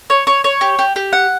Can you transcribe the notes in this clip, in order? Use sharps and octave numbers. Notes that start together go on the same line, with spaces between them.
C#5
C#5
C#5
G4
G4
G4
F#5